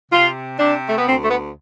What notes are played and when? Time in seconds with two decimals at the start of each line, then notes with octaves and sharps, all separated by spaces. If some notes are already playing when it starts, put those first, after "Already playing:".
0.12 C3 F4
0.59 C3 D4
0.88 A3
0.97 B3
1.06 D2 C4
1.23 A3
1.30 B3